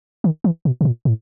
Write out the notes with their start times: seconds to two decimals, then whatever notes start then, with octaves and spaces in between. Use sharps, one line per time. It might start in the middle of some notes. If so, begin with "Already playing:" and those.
0.24 D#3
0.44 E3
0.65 B2
0.81 B2
0.85 A#2
1.05 A2